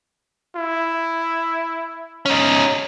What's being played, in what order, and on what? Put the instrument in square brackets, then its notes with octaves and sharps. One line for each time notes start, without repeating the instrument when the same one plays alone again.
[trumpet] E4
[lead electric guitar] C#4 D#4